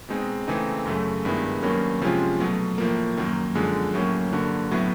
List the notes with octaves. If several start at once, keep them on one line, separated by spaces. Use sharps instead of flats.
B2 G#3 C4 D#4
C#3 E3 A3 C4 D#4
F#2 C#3 F#3 A3
G2 D#3 G#3 B3 E4
G2 D#3 F#3 A#3 C#4
C3 F3 G#3 C#4 F4
B2 F#3 A3
A2 F3 A#3
F#2 D#3 F#3 A#3
F#2 D3 F3 G#3
A2 F#3 A#3 C#4
G2 D3 F#3 A#3
A2 F#3 B3 E4